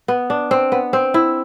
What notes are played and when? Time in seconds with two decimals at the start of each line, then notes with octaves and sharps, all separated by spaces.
0.08 B3
0.30 D4
0.51 C4
0.72 B3
0.93 C4
1.14 E4